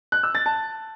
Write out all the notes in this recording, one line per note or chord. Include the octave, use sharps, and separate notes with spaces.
F#6
E6
A6
A5